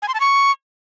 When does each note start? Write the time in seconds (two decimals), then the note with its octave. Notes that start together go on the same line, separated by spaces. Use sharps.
0.02 G#5
0.08 C6
0.14 A5
0.20 C#6